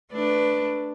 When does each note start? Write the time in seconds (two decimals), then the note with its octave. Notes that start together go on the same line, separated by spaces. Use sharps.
0.12 A3 D4 B4